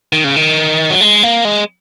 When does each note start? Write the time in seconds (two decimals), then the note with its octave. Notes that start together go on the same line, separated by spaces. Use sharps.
0.13 D#3
0.24 C#3
0.36 D#3
0.90 F#3
1.01 G#3
1.23 A#3
1.45 G#3